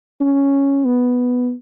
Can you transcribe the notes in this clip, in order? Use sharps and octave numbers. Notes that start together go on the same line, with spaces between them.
C#4
B3